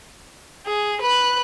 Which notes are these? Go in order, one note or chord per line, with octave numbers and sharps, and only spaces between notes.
G#4
B4 F#6